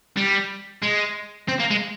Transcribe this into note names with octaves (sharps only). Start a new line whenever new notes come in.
G3
G#3
C4
A#3
G#3